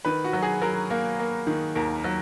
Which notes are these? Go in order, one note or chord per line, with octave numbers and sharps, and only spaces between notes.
D#3 B4
F#4
F#3
G#4
F#3 A#4
A#3
A#3
D#3
D#2 A#4
F#3